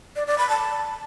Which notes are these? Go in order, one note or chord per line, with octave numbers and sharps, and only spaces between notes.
D5
D5
B5
A5